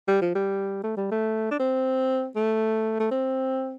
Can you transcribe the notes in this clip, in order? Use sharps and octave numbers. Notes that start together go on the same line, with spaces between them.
G3
F3
G3
A3
G3
A3
D4
C4
A3
A3
C4